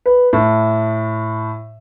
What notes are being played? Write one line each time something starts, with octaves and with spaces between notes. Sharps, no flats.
B4
A2